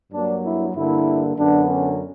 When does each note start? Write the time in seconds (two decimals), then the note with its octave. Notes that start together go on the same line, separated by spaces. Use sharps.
0.12 G2 F#3 A#3 D4
0.43 E4
0.75 G2 D3 A#3 E4
1.37 F#2 D3 F#3 B3 D4
1.68 C#4